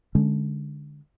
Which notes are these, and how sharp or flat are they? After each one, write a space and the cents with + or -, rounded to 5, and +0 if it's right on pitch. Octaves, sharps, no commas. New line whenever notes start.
D3 +0 G#3 +0 C#4 +0